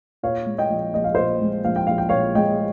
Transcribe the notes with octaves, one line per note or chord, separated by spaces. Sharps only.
A#2 C#5 F5
G#3
D#5 G5
A#1
A#1 D#5
F5
A#2 C5 D#5
G#3
A#1 F5
G5
A#1 F5
G5
A#2 C#5 F5
G#3 D#5 G5